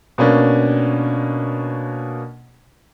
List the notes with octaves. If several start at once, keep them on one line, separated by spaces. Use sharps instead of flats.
B2 A#3 C#4 D4